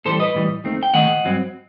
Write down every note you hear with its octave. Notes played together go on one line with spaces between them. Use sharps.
A2 E3 G3 A4 C5
B4 D#5
A2 E3 G3
D#2 D#3 A3 C4
G5
D#2 D#3 A3 D#5 F#5
G2 F#3 C4